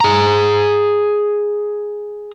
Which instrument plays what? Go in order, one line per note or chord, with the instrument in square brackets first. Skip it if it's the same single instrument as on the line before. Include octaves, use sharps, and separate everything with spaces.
[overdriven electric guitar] G#4 A#5